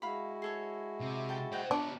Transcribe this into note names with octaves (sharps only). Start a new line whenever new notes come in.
G#3 E4 F#4 F5 B5
G#4 A4 C#5
C3
A4 G5 A5
C5 D#5 F#5 G5
B3 D4 G4 B4 C#5